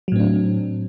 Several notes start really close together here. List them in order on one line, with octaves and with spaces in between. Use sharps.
F#3 A2 C4 D4